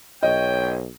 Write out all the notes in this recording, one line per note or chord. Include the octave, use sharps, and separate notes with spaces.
B1 C#5 D#5 G5